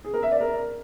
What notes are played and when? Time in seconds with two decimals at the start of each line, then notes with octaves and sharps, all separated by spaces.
0.04 G#4
0.14 A#4
0.23 E5
0.32 D5
0.41 A#4